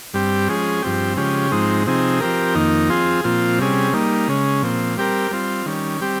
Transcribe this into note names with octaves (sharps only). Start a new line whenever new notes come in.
G2 G3 C4 G4
F3 G#3 C#4 G#4
G2 F3 C4 G4
C#3 F3 G#3 C#4 G4
G#2 F3 G#3 C4 D#4
C3 F3 C4 D#4 G#4
F3 C4 G4 A#4
F2 D#3 A#3 D#4
F3 C4 F4 G#4
A#2 F3 C4 F4
C3 G3 C#4 G#4
G3 A#3 D#4
C#3 G#3 C#4
A#2 F3 C4
G3 C4 G4 A#4
G3 C4 F4
D#3 G3 C#4
G3 C4 G4